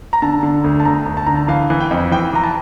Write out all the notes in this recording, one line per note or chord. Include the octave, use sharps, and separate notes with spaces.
A#5
D3 A5
D3
D2
A5
D2 A#5
D2
A5
D3 A#5
A5
E3 F5
E3
G5
F2
E3 G5
E3 A#5
A5